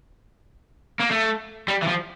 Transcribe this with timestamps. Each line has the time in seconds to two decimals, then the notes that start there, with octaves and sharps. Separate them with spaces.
1.00 A#3
1.11 A3
1.68 G3
1.83 E3
1.88 F3